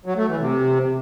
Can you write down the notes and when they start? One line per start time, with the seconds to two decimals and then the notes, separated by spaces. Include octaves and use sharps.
0.06 F#3
0.17 A3
0.28 E3
0.40 C3